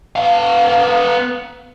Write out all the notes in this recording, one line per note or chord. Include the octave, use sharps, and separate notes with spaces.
B3 F5